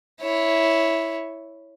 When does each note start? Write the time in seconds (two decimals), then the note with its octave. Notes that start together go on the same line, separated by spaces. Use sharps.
0.22 E4 C#5